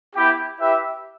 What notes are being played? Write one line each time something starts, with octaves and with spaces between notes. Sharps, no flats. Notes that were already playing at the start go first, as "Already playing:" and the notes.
B3 E4 G4
E4 G4 B4 E5